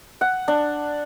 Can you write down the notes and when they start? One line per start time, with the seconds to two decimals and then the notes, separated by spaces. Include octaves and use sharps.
0.21 F#5
0.48 D4